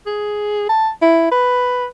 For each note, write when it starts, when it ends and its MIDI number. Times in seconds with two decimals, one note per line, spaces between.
0.06 0.68 68
0.69 0.89 81
1.02 1.28 64
1.32 1.86 71